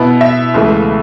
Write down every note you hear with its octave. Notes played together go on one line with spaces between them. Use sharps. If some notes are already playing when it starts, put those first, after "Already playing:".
Already playing: B2 B3 E4
E5
C#2 C#3 E3 A3